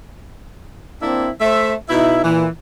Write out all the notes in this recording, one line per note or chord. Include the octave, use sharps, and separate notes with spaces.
A#3 C4 D4 E4
A3 C5 E5
B2 D#4 E4
A#2 E3